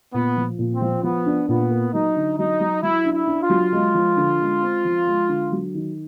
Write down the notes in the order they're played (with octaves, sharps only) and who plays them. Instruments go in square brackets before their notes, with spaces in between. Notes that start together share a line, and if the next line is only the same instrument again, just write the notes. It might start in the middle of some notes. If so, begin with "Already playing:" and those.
[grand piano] A#2 [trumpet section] B3
[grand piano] F3
A#2
[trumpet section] C4
[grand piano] F3
[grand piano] F3 [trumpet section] B3
[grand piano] D4
[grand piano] A#2 [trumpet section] B3
[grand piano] A#3
[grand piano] F#3 [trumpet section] D#4
[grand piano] D3
[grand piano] F#3 [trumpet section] D#4
[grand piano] F#3
[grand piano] F#3 [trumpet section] E4
[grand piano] D4
[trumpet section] E4
[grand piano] D4
[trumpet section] F4
[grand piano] F#3
G#3
F3
D3
G#3
C4
F3
G#3
D3
F#3
D#3